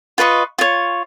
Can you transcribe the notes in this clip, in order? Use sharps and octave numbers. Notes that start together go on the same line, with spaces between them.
F4 B4 D#5 C#6
F4 C#5